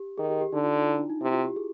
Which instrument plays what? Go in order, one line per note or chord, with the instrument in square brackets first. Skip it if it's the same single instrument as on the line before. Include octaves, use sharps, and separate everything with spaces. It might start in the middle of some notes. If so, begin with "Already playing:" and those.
Already playing: [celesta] G4
[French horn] D#3 [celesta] G#4
[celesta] G4
G4
[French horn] D3 [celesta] D#4
[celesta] F4
D#4
F4
E4
D4
D#4
[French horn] C3 [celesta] E4
[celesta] F4
G4
G#4